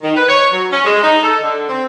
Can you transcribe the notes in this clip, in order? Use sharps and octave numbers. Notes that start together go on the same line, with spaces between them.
D#3
B4
C#5
F#3
C#4
G#3
D#4
A4
D3
C4